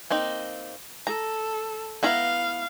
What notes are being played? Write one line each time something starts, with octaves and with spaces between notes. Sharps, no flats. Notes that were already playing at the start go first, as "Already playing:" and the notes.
A#3 C4 D#4
A4 A#5
B3 E4 F5 A#5